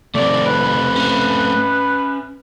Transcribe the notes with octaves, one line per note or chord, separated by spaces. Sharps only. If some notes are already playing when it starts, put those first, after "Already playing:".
C3 D#3 A3 C4 D5
B4
C#4 E5